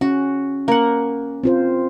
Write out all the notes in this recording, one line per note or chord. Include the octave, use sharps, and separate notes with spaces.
C#4 F#4
A#3 C#4 F#5
C4 F4 C5